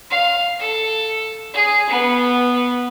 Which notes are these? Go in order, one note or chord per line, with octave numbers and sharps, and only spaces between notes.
F5
A4
G#4
B3